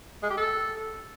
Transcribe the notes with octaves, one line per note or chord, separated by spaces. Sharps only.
G#3
G4
A4